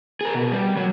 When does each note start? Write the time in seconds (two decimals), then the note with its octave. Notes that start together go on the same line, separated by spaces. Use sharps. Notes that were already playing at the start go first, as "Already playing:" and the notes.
0.21 G#4 A#4
0.34 B2
0.52 G3
0.77 F#3